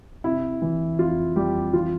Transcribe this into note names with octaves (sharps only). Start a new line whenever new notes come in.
C3 E4
E3
F2 F4
F2 G3 G4
E3 F4